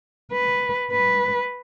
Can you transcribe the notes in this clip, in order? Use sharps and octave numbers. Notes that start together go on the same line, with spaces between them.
B4
B4